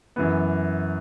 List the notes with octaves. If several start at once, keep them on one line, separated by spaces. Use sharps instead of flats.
F#2 E3 B3